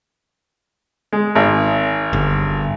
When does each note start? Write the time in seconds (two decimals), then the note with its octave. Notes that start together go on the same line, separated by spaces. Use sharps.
1.13 G#3
1.35 G#1
2.13 G1